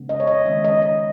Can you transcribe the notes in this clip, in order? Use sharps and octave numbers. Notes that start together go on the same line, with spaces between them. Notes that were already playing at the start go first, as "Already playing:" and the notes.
Already playing: C#3 G#3 B3
D#5
C#5
D#5
D#3 G#3 B3 E5
D#5
D#5